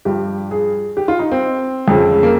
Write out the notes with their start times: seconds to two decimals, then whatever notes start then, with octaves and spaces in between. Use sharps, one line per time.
0.05 G2 F3 G4
0.51 G#4
0.97 G4
1.08 F4
1.19 D#4
1.32 C4
1.88 F2 C#3 F3
2.12 G#3
2.23 A#3